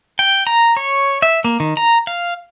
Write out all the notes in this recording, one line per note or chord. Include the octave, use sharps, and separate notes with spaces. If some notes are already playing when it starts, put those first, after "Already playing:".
G5
A#5
C#5
E5
A#3
D#3
A#5
F5